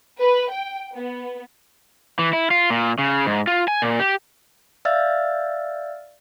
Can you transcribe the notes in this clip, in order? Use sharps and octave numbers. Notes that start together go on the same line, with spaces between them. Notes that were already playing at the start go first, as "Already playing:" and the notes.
B4
G5
B3
E3
E4
F4
A#2
C#3
G#2
F4
G#5
A#2
G4
D5 E5 F5 E6 F6 A6